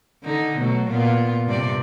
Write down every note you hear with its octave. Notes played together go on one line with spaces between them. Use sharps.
D3 D#4
B2 F#3 A3
A#2 B3 F4
G2 C3 D5